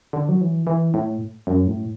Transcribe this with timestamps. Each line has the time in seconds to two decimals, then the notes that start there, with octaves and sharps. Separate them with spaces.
0.13 D3
0.29 F#3
0.41 E3
0.67 E3
0.94 A2
1.47 F#2
1.67 A2